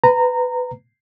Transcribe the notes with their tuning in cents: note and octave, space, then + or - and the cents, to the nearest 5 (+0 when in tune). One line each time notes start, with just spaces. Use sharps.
B4 +15 A#5 -15